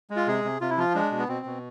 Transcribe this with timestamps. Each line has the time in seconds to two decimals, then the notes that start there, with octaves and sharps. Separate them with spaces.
0.10 G#3
0.16 F4
0.27 C3 G#4
0.45 C3
0.61 C3 F4
0.70 E4
0.77 F3 F4
0.94 G#3 D4
1.11 B2
1.19 B3
1.28 B2 C4
1.46 B2